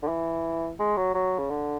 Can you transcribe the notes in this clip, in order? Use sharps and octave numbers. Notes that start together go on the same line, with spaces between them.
D3
E3
G#3
F#3
F#3
C#3
D3